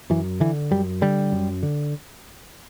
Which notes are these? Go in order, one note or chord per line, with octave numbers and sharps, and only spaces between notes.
F#2 E3
D3 E3
F#2 G3
D3 G3
F#2
D3